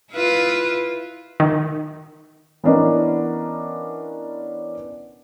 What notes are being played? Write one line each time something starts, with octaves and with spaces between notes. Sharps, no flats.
E4 F4 B4
D#3
E3 B3 C#4 D4 A#4 D#5